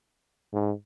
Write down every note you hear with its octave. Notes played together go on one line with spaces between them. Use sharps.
G#2